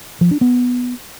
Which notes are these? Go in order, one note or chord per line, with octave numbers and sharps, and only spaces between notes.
F3
D4
B3